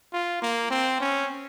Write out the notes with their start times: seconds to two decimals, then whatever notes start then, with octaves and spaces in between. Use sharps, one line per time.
0.13 F4
0.42 A#3
0.70 C4
1.00 C#4